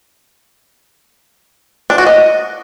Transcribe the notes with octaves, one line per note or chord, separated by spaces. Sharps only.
D4
F#4
D#5